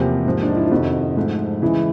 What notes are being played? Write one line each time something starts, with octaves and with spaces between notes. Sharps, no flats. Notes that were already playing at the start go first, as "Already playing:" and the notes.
Already playing: E2 C3 F3 A#3 G4
G#2 F3 A#3
D4
D#4
E4
F4
F2 C3 D#3 F#4
G#2 F3 A3
C#3 E3 G#3 E4